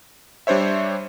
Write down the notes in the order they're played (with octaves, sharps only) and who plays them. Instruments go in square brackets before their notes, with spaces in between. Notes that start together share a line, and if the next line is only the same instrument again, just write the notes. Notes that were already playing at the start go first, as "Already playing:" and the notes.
[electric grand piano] G3 D4 C5 C#5 E5